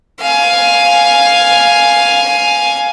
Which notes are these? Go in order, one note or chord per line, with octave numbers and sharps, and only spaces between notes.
F5 G#5